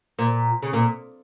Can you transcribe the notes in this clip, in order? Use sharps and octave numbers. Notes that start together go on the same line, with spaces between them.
A#2
C#3
A#2